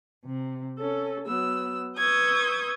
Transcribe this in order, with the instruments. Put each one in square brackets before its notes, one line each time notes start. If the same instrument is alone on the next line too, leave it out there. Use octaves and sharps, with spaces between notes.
[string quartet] C3
C#4 A4
F#3 B3 E6
B4 C#6 D#6 E6 G6 G#6